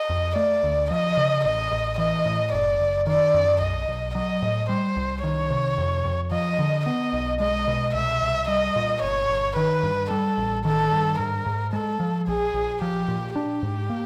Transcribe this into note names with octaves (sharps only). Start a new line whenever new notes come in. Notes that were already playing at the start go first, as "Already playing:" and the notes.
Already playing: D#5
F2
A3 D5
D2
F3 D#5
C#3
A1 D#5
A1
E3 D#5
A2
F#1 D5
F#1
D#3 D5
F#2
B1 D#5
B1
F#3 D#5
A2
G3 C5
C2
D#3 C#5
C3
F2
F2
F3 D#5
D3
B3 D#5
B1
G#3 D#5
B2
C2 E5
C2
G3 D#5
A#2
G1 C#5
G1
D#3 B4
G2
G3 A4
A1
D#3 A4
G2
G#2 A#4
G#2
G#3 A4
F3
A#1 G#4
A#1
F3 G4
A#2
D4 G4
G#2
A#3